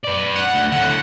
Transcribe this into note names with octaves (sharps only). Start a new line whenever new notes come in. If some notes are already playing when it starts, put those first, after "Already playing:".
B4 D5
F#5
D2
A2 D3 F#5